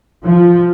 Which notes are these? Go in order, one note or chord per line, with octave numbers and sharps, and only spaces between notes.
F3